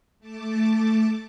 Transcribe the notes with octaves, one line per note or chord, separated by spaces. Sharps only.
A3 A5 D6